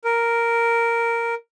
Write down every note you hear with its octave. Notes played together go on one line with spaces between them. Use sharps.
A#4